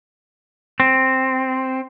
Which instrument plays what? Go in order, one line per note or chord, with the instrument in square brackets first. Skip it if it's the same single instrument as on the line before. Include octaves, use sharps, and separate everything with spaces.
[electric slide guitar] C4